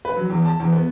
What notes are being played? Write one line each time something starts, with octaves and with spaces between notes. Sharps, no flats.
B4
F#3
E2
A5
E2
B3